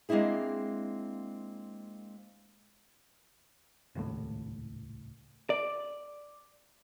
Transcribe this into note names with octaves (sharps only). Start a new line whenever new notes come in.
G#3 A#3 C4 D4 E4 G#4
D#1 C#2 A2
D5